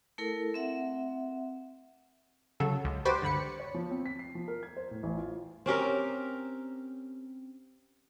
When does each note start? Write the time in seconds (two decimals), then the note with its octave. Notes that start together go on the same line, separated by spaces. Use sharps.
0.18 A3 E4 A4 A#4
0.54 C4 E5 F#5
2.60 C#3 F#3 A4
2.84 C#2
3.05 F#4 G4 B4 C5 D5
3.22 G2 D3 B5 C#7
3.59 C#5
3.74 F3
3.91 C4
4.06 B6
4.19 C7
4.35 F3
4.48 A#4
4.63 G#6
4.77 C5
4.91 A2
5.03 A1
5.17 F4
5.66 C4 C#4 G4 A#4